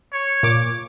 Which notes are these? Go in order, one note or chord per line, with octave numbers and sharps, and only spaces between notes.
C#5
A#2 D6